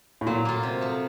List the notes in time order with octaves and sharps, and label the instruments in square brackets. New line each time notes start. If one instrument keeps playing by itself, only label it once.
[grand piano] A2
[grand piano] A#2 [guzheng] F#3
[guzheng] A#3 F4
C3
F3 A3